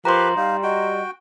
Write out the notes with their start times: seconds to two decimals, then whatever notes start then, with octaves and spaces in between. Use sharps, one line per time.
0.05 F3 G4 A#4 B4 A#5 C6
0.36 G3 D#4 F5
0.63 F#4 D#5 G5